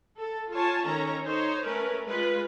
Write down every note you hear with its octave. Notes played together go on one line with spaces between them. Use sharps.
A4
F4 C#5 G#5 A5
D#3 C#4 A4 C#5 A#5
D#4 C5 C#5
A3 C#4 A#4 B4
G#3 F4 B4